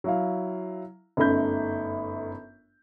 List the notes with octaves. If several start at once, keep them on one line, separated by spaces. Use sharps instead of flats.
F#3 E4 F5
G1 F#2 A3 D#4 B5 G6